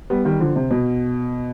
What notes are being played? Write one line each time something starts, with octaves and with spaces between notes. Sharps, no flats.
G3 B3
D#3 G3
D3 F3
C3
B2